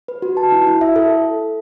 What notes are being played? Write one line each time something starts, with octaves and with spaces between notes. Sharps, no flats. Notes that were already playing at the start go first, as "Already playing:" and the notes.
B4
F#4
A5
E4
E4
E5
A4